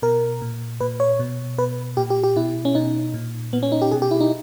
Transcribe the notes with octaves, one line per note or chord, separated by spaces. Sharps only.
B2 A#4
A#2
A#2 B4
C#5
B2
B2 B4
A#2 G4
G4
G4
B2 E4
C#4
B2 D#4
A#2
A#2 B3
C#4
D#4
G4
B2 G#4
G4
E4
D#4